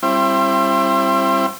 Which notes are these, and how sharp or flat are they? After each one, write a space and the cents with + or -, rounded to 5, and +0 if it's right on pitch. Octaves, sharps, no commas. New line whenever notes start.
G3 +0 C4 +30 E4 +35